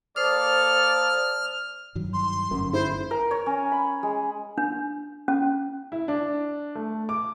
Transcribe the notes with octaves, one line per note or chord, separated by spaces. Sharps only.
A#3 A4 C5 D5 D#6 F6
G2 D#3 F#3
C6
G1 F#2 C#4
E4 C5
A#4
C#5
C#4
B5
G#3
D4
C#4
E4
D4
A3
D6